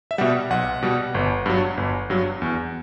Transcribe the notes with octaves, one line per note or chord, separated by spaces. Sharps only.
E5
B2 G3 F#5
B1 F#5
B2 G3
G1
G2 F#3
G1
G2 F#3
E2